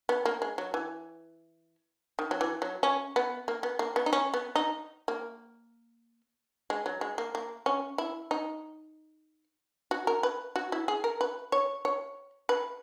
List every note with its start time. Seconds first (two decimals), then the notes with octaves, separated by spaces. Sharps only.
0.09 B3
0.25 A#3
0.42 G#3
0.58 F#3
0.74 E3
2.19 D#3
2.31 F#3
2.41 E3
2.62 F#3
2.83 C#4
3.16 B3
3.48 A#3
3.63 B3
3.79 A#3
3.96 B3
4.06 D#4
4.13 C#4
4.34 B3
4.56 D#4
5.08 A#3
6.70 G#3
6.86 F#3
7.01 G#3
7.18 A#3
7.35 A#3
7.66 C#4
7.98 E4
8.31 D#4
9.91 F#4
10.07 A#4
10.23 B4
10.56 F#4
10.72 E4
10.88 G#4
11.04 A#4
11.21 B4
11.52 C#5
11.85 C#5
12.49 B4